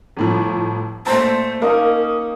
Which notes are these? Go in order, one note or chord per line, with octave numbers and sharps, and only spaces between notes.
G1 A2 F3
A#2 A3 C5 A5
A#3 C#4 D#4 A#4 D#6